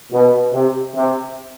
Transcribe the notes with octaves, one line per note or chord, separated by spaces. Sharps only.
B2
C3
C3